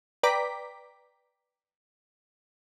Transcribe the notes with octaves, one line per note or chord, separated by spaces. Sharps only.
B4 D5 G5 A#5 D6 B6